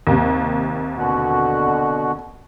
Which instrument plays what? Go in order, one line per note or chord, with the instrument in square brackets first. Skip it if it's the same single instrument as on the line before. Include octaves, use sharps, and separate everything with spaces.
[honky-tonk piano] D#2 C3
[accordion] B2 D3 F#4